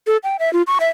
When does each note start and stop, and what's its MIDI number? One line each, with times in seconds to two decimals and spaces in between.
0.07 0.17 69
0.24 0.37 79
0.39 0.52 76
0.53 0.62 65
0.67 0.78 85
0.80 0.89 76